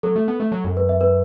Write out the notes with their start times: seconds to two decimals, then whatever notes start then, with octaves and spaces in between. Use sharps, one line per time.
0.03 F#3 A4
0.16 A3
0.28 B3
0.40 A3
0.52 F#3
0.64 F#2
0.77 B4
0.89 E5
1.01 B4